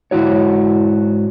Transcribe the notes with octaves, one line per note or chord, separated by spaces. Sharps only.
G#2 C3 E4 F#4 C#5